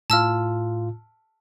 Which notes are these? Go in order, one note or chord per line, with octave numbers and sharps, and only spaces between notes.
A2 F4 A5 E6 F6